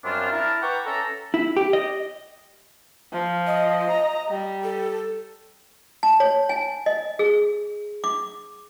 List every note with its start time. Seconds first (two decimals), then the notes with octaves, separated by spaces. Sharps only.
0.04 F#2 G3 C4 D4 F4
0.31 E4 A#4 A5
0.62 B4 F#5 G5 A#5 C#6 D6
0.85 C#4 A4 E5 A5 A#5
1.34 E4
1.57 G4
1.73 D#5
3.13 F3
3.47 D#5
3.90 A#5
4.30 G3
4.64 A4
6.03 A5
6.20 C#5
6.49 G#5
6.86 D#5
7.19 G#4
8.04 D6